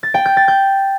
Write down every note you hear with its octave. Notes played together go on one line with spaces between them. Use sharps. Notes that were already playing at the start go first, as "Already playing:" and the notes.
A6
G5
G6
A6
G6